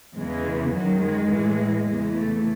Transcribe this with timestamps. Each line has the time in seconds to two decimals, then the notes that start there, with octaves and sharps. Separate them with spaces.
0.16 E2 C#3 E3 G#3
0.72 F#2 D#3 F#3
1.01 G#3
1.30 A2 E3
1.86 E2 C#3 E3 G#3
2.15 A3